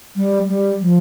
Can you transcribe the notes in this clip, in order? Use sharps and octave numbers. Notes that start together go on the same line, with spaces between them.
G3
G3
F3